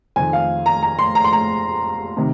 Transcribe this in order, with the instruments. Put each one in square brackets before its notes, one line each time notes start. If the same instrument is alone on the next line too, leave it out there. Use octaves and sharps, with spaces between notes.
[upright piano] F2 D#3 G#5
F5
A#5
A#5
C6
A#5
C6
A#5
C3 D#3